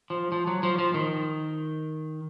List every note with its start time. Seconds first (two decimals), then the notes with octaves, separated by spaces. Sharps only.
0.10 F3
0.32 F3
0.47 F#3
0.63 F3
0.79 F3
0.94 D#3